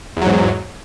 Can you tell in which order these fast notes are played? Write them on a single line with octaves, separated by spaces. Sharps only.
E2 F#3 G#2